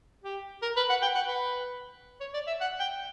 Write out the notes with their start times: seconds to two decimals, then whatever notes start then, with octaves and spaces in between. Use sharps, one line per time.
0.24 G4
0.62 A#4
0.77 B4
0.90 F#5
1.02 G5
1.15 F#5
1.28 B4
2.21 C#5
2.34 D5
2.47 E5
2.61 F#5
2.80 G5